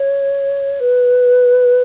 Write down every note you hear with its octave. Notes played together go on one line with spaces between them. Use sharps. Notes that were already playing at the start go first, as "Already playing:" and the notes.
Already playing: C#5
B4